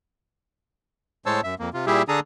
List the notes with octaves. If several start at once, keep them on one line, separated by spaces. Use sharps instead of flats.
A2 G#3 C5 C#5 A5 E6
F#2 E5
F2 A#3
C3 F4
A#2 G3 E4 G4 G#4 E5
D3 D4 G#4 A4 A#5 D#6